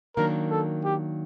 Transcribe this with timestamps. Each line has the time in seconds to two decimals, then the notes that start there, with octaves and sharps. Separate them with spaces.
0.16 D#3 F#3 A#3 D4 A#4
0.51 A4
0.85 G4